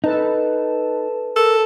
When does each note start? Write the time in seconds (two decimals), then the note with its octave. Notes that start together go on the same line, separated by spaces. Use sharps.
0.04 D#4 A4 B4 A5
1.36 A4 A#4